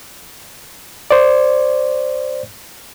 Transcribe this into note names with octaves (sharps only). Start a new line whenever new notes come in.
C5 D5